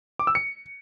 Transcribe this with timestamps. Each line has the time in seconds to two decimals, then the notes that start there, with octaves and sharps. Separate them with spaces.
0.19 D6
0.27 E6
0.35 C#7